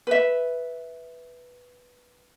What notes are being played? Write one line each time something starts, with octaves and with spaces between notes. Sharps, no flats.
B4 E5